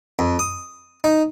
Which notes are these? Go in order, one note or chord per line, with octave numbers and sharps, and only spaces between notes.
F2
D#6
D#4